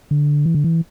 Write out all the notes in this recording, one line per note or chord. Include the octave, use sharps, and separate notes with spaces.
D3
E3
D3
E3